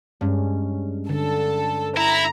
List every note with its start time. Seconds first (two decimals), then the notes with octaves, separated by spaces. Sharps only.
0.21 G2 G#3 C#4
1.09 D3 A4
1.97 E4 A#5